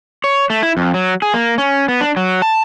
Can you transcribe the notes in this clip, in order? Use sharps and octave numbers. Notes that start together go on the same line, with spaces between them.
C#5
A3
E4
F2
F#3
G#4
A#3
C#4
B3
D4
F#3
A5